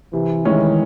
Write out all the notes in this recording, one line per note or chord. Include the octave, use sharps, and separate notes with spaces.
C3 E3
D#3 G#3 C#4 E4